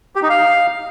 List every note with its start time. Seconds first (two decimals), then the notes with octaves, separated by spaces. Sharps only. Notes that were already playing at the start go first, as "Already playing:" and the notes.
0.16 G4
0.23 D#4
0.30 F5